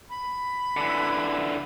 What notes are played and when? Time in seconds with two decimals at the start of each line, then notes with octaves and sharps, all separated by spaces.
0.10 B5
0.77 D3 E3